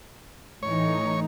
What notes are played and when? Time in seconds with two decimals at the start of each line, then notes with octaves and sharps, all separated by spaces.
0.63 A2 E3 D#4 C#5